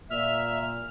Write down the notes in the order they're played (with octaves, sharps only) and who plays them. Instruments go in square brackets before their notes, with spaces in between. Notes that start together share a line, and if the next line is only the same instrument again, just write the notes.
[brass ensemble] A#2 [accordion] E5 [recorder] F6